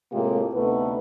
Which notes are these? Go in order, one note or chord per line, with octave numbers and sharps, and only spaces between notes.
A2 C3 G#3 A#3 F4 G4
D2 C3 A3 B3 D#4 B4